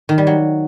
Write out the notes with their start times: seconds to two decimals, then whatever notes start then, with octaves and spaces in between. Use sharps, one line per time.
0.09 D#3
0.18 G3
0.27 F#3